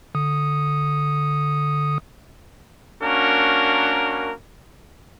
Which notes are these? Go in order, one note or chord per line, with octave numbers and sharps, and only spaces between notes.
D3 D#6
A#3 C#4 D4 F#4 A#4